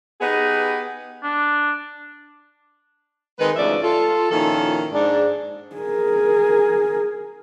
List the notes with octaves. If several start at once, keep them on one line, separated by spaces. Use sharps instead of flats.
B3 D#4 G4 G#4 B4
D4
D#3 G#3 C4 D#4 B4
D2 G#2 F3 C#4 D5 E5
F4 A4
A#2 D#3 F3 C#4 E4 A4
G#2 D4
G#4 A#4